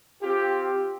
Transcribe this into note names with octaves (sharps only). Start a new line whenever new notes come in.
C4 F4 G4